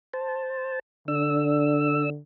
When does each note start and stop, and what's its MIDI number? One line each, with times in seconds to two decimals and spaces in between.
0.13 0.79 72
0.13 0.79 81
1.08 2.20 50
1.08 2.10 62
1.08 2.10 88